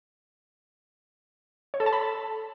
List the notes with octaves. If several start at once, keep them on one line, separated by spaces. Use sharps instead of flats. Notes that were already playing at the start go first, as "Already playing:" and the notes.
C#5
A4
A5
B5